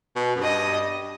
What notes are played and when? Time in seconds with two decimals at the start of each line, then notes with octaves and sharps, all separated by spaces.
0.16 B2
0.36 F#2
0.42 G2 D#5